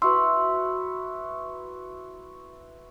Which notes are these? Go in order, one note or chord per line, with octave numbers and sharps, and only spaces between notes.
E4 F#4 B4 C6 E6